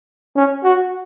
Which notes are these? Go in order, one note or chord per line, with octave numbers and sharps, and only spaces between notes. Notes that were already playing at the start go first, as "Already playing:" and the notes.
C#4
F#4